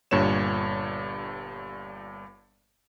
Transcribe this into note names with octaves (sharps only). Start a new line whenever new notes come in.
G1 G2 A#2 C#5 E7